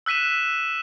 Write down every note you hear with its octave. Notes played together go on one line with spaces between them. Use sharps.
E6 F#6 B6 D#7 E7